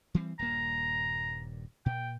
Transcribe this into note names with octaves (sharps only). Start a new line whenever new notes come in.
E3 G3 C4
D#1 G2 A#3 A#5
A#2 G5